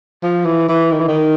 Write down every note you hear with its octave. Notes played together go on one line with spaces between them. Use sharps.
F3
E3
E3
D#3
E3
D#3